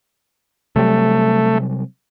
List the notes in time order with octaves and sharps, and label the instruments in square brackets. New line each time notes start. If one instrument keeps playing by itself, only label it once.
[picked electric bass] C3 F#3 G3 [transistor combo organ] A3